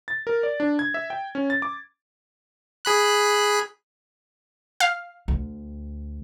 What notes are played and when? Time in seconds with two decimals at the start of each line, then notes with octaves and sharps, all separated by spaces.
0.08 A6
0.27 A#4
0.43 D5
0.60 D4
0.79 G#6
0.94 E5
1.10 G5
1.35 C#4
1.50 A6
1.62 D6
2.85 G#4 B5 F#6
4.80 F5
5.28 D2